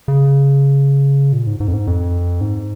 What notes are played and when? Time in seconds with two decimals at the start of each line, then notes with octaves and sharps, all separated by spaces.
0.08 C#3
1.33 A#2
1.47 G#2
1.60 G#2
1.68 F2
1.74 G#2
1.87 F2
2.41 G#2